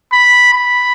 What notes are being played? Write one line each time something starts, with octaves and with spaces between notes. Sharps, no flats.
B5
B5